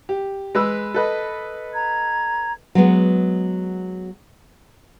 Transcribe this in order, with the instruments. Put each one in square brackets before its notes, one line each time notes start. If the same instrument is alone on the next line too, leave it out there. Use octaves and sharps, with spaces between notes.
[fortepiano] G4
G#3 B4 E6
A4 B4 D#5
[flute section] A#5 G#6
[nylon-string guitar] F#3 G#3 B3